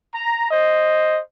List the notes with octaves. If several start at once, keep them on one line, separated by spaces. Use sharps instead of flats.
A#5
C5 D#5